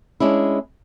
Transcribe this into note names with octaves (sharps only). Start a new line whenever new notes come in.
G#3 C#4 D4 E4